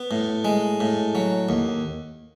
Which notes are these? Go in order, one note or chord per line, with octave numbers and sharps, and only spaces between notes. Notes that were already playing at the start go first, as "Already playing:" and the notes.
Already playing: B3
A2
G#3
A2
F#3
D#2